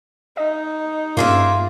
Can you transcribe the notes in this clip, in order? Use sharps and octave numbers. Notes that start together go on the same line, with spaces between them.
D#4 D#5
G2 A#3 C#4 F4 G#4 E5